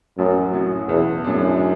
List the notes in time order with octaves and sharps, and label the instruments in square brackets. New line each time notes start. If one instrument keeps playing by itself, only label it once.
[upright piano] A1 [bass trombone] F#2
[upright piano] A2 F#3 C#4 F#4
[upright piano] B1 [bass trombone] E2
[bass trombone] F#2 [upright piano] A2 G#3 D4